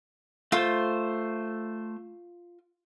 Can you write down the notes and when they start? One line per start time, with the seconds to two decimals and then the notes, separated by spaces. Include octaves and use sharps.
0.52 A3 F4 C5